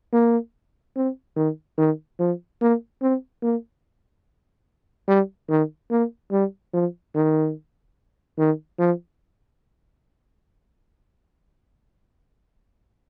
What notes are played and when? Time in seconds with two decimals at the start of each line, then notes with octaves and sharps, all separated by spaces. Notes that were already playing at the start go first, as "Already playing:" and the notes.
0.13 A#3
0.96 C4
1.36 D#3
1.78 D#3
2.19 F3
2.61 A#3
3.02 C4
3.42 A#3
5.08 G3
5.50 D#3
5.91 A#3
6.32 G3
6.73 F3
7.15 D#3
8.38 D#3
8.79 F3